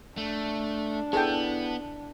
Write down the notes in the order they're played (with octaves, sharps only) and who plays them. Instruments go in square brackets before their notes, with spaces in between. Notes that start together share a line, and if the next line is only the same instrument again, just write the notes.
[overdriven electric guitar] A3 [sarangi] D4
[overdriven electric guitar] B3 [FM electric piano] E4 A5 [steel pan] G#4 A4 G5